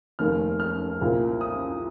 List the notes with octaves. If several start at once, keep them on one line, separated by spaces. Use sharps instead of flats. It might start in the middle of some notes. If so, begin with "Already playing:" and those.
F1 D#2 D#3 A#3 F6
F6
C2 A#2 A#3
D#6